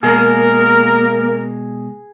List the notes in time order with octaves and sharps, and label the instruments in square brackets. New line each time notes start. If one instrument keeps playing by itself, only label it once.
[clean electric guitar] B2 G#3 [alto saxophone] A#3 [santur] G#4 [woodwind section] A#4